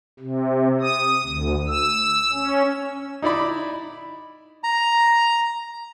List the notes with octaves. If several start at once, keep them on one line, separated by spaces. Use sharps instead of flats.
C3
D#6
D2
E6
C#4
D#4 E4 D5 B5
A#5